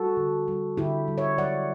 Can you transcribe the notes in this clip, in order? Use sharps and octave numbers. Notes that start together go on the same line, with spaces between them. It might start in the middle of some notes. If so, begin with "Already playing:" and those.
Already playing: G3 F#4 A4
D3
G3
D3 E4 G4
G3
C#5 E5
F#3 D5 F#5